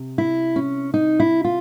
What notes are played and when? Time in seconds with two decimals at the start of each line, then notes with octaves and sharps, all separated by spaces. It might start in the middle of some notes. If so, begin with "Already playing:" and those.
Already playing: C3
0.18 E4
0.56 C#4
0.94 D#4
1.20 E4
1.45 F4